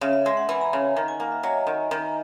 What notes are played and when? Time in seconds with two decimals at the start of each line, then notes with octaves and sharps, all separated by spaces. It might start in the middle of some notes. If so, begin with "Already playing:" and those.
0.01 C#3 E5
0.13 E5
0.25 G#3 E5
0.37 F#5
0.49 E3 G#5
0.61 A#5
0.73 C#3
0.96 D#3 A#5
1.08 G#5
1.20 A#3 F#5
1.32 E5
1.43 F#3 D#5
1.67 D#3
1.91 D#3